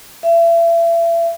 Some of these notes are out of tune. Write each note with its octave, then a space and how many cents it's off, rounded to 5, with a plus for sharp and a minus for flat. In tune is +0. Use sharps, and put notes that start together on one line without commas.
E5 +35